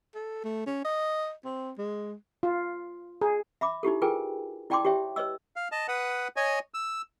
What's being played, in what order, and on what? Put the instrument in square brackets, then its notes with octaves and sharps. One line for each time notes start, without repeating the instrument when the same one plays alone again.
[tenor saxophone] A4
A3
C#4
D#5
C4
G#3
[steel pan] F4
G#4
[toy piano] E5 B5 D6
D#4 E4 G4 A4
F4 G#4 A#4 B4 G5 G#5
E4 D5 G5 A5 C6 D6
G4 C#5 E5 G5
B4 C#5 D#5 E6
[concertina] F5
D#5 A5
B4 F#5 D#6
C#5 D#5 G#5
E6